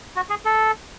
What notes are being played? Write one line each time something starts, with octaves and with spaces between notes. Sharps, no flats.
F#4
G#4
A4